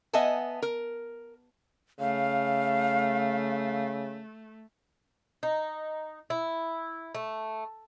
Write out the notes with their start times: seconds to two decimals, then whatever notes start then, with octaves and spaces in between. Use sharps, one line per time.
0.13 B3 D#5 E5 F#5 G#5 A5
0.62 A#4
2.00 C#3 A3 F5
5.43 D#4
6.30 E4
7.15 A3